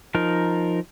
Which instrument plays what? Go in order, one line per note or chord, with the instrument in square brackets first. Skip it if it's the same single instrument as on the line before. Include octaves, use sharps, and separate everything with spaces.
[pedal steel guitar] F3 D#4 A#4